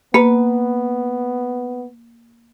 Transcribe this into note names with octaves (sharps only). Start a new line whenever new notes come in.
A#3 B3 B4